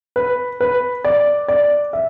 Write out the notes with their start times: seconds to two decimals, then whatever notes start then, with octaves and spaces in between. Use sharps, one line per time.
0.16 B4
0.61 B4
1.04 D5
1.48 D5
1.93 E5